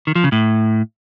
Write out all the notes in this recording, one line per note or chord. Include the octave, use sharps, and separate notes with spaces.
D#3
F3
C#3
A2